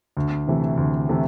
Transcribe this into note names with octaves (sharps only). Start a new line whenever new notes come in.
D2
C3 E3 A3
D2
C3 E3 A3